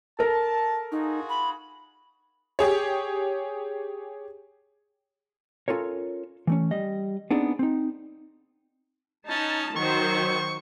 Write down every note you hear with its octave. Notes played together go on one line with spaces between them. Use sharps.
A4 A#4 A5
D#4 F4 F#4 G#4
B5
G4 G#4 C#5
C#4 F4 A4 A#4 C#5
E3 A3 C#4
G3 D#5
B3 C4 D4 D#4 G#4
C4 D#4
C#4 D#4 A5
D#3 F#3 C5 C#6